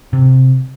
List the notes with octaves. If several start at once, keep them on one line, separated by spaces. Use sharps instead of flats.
C3